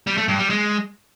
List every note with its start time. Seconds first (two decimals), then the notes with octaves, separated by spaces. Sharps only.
0.07 G3
0.18 A3
0.28 G2
0.39 G3
0.50 G#3